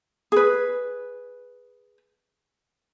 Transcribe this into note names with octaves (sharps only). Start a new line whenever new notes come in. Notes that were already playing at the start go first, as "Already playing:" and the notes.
G#4 B4